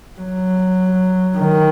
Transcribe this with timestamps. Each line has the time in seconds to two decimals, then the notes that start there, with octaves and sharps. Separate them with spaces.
0.20 F#3
1.38 D#3